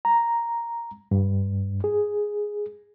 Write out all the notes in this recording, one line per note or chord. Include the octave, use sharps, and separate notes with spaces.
A#5
G2
G#4